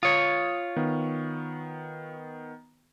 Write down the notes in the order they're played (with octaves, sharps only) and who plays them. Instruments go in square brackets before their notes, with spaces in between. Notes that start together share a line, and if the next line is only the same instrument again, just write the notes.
[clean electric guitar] F4 C#5 [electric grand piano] D#6 G#6
[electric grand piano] D#3 B3